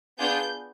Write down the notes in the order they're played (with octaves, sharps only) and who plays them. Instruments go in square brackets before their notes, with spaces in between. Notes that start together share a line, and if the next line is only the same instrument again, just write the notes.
[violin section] B3 D4 F4 G#4 G6